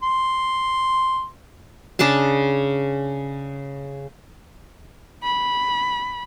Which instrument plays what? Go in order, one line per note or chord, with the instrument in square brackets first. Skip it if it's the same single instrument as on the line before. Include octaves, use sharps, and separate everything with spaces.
[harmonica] C6
[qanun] C#3 D4 G#4 A5
[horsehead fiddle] B5